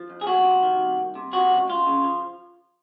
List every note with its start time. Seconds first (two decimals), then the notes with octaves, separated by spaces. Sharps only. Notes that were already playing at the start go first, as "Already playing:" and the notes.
Already playing: F3
0.10 F2
0.21 G#4
0.27 F2 F#4
0.44 C3
0.63 D#3
0.79 C2
0.98 C2
1.15 C3
1.33 F3 F#4
1.51 C#2
1.69 C#2 F4
1.87 C#3
2.04 F3